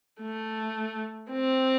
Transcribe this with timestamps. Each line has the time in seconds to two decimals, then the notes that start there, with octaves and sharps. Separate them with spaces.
0.21 A3
1.31 C4